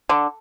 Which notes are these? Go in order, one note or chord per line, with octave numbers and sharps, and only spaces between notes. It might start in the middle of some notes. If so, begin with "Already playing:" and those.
D3